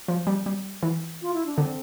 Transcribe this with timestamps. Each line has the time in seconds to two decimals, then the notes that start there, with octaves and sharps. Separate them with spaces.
0.08 F3
0.27 G3
0.46 G3
0.83 E3
1.21 F4
1.33 E4
1.45 D4
1.57 D3 C4